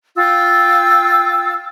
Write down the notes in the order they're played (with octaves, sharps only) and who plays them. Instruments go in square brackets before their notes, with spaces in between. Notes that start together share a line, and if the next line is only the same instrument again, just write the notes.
[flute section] F4 G5 E6